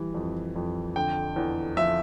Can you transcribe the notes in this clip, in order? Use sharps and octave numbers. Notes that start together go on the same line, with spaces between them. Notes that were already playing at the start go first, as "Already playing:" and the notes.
Already playing: E3 G3
F2
F2
D3 G5
E2
F3 E5